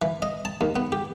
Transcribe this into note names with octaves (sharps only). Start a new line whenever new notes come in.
E3
D#5
A5
D#2
B3
G4